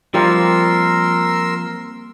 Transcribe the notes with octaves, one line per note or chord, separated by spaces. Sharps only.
F3 G3 A#3 C4 A#4 C6 E6